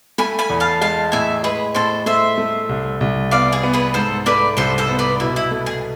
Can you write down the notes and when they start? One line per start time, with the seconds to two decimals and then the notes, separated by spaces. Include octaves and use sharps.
0.18 A3 G#5 B5
0.39 G#5 B5
0.50 E2
0.60 F5 A5
0.81 G#3 F5 A5
1.12 A2 E5 G#5
1.43 G#3 G#4 B4
1.75 A2 A4 C5
2.06 A3 C5 E5
2.38 A3
2.69 C2
3.01 C2
3.31 B3 D5 F5
3.53 G#4
3.63 B3
3.74 G#4 B4
3.94 G#2 A4 C5
4.26 A3 B4 D5
4.57 C2 A4 C5
4.78 A4 C5
4.89 B3
4.99 B4 D5
5.20 B2 E4
5.36 E4
5.51 A3
5.66 G#4